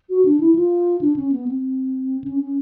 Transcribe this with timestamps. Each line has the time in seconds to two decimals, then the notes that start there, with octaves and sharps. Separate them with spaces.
0.10 F#4
0.25 D4
0.40 E4
0.55 F4
1.01 D4
1.16 C#4
1.32 B3
1.48 C4
2.24 C#4
2.40 C#4